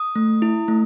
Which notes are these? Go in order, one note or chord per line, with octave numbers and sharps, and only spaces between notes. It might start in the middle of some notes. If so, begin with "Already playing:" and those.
Already playing: D#6
A3
E4
A3